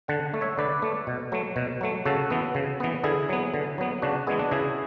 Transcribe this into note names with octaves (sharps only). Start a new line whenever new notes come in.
D3 F#5 A5
A3
C#5 E5
D3 B4 D5
A3
B2
F#3 A3
B2
F#3 A3
C#3 F#4 A4
E3 B3
C#3
E3 B3
D3 E4 G#4
F#3 B3
D3
F#3 B3
C#3 D4 F#4
E3 G#3 B3 E4 G#4
D4 F#4
C#3 E4 G#4